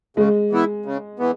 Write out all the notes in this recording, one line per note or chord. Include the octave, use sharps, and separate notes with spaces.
C#3 G#3
E3 B3 E4
C#3
E3 B3